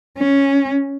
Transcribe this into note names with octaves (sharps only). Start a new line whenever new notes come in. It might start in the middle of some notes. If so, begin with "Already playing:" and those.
C#4